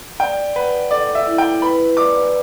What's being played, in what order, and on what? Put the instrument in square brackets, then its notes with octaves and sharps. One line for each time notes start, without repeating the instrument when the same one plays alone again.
[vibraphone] D5 [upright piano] G5
[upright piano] B4 [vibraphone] F#5
[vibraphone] A4 [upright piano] D5
[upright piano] E5
[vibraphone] E4
[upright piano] G5
[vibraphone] B4 [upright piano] B5
[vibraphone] D5 [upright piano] D6